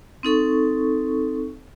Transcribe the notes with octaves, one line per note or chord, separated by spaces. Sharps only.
C4 D#4 A4 C#6